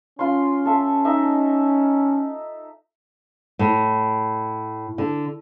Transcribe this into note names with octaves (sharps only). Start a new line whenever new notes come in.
C#4 F4 C6
A4 E5
D#4 D#5 E5
A2
D3